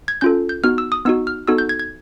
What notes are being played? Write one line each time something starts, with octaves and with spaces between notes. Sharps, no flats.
G#6
C#4 F4 A4 G6
G6
B3 D#4 F#4 F6
E6
D#6
B3 D#4 F#4 E6
F6
B3 D#4 F#4 A4 E6
G6
G#6
G#6